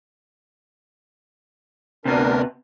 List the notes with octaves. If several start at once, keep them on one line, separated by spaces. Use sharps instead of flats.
D2 C3 B3 D4 A#4